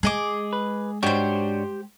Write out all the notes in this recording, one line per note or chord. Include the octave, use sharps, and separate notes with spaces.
G#3 G#4 D#5 D6
B4
G#2 D4 F#4 G4 C5 C#5